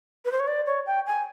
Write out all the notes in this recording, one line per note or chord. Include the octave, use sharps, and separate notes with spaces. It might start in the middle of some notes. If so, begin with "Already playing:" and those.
B4
C5
C#5
D5
C#5
G5
G#5